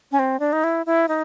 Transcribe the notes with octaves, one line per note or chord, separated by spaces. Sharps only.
C#4
C4
D4
D#4
E4
E4
D#4